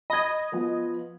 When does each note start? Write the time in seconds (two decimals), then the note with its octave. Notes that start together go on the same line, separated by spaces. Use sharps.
0.10 D#5 B5 G#6
0.52 F3 B3 B4